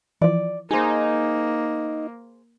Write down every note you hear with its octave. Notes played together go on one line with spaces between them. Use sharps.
E3 F3 D5
A#3 D#4 G#4 C5